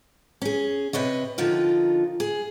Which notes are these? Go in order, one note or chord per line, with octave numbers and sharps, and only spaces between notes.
C#4 G#4
C3 B4 C#5 D#5
D3 D#3 F3 D#4 F4
G#4